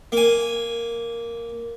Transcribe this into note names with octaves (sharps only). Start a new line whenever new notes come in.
A#3 G#5